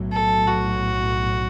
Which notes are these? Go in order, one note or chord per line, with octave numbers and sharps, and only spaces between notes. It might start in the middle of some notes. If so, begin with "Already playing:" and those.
Already playing: B1 A2 F#3
A4
F#4